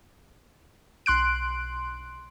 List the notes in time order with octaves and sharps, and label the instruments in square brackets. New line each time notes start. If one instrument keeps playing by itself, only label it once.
[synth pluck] B1 C6 F#6 D7